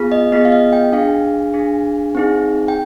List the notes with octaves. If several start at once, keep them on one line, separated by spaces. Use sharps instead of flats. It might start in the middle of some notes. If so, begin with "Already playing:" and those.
Already playing: B3 F4 G#4
D#5
B3 F4 G#4 D#5
F5
D#5
G5
D4 G#4 F5
D4 G#4
C4 D#4 G#4
G5